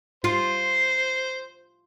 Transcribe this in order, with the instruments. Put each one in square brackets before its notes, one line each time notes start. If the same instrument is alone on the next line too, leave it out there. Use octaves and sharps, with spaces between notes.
[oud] F4 [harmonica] C5